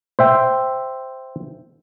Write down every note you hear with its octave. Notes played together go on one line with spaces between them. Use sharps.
C5 E5 G5